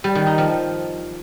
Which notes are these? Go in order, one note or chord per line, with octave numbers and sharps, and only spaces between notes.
G3
D#3
D#4
F3